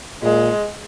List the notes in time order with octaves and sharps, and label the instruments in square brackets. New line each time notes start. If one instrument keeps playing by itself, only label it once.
[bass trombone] A#2 [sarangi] G#3